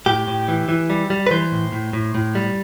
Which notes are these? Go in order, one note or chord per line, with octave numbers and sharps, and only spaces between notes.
A2 G4
A2
E3
E3
G3
G3
B4
E3 C5
A2
A2
A2
A2
G3